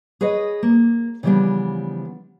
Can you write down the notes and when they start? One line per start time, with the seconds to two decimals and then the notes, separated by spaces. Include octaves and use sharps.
0.21 G#4 B4 C#5 D#5
0.63 A#3
1.23 C#3 E3 F3 G3 B3 D4